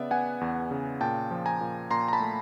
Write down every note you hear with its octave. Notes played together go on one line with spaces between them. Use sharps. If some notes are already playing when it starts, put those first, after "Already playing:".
Already playing: C#3 B3 D5 E5
B3 F#5 G#5
E2
C#3
A#2 G5 A5
F3
G#5 A#5
A#2
A#2 A#5 C6
A#5
A5 B5
A3